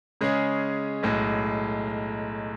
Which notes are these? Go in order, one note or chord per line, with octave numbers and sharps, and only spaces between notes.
C#3 G#3 C#4 G#4
B1 A2 G#3